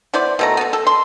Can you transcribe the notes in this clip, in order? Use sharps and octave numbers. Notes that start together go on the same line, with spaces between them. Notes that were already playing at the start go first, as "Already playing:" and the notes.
B3 E4 C5 D5
B2 A3 A#5
B3 A4
A4
C6